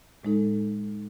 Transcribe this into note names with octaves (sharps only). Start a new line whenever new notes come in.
A2 G#3 D#4 A4